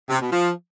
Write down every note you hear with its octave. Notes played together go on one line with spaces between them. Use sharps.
C3
B2
F3